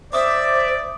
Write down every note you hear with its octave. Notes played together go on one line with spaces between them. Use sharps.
C5 D5 E5 D6 D#6